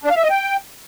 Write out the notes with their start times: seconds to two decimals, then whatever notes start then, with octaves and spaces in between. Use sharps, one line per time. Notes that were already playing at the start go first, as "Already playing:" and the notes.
0.04 D4
0.10 F5
0.17 E5
0.23 D#5
0.30 G5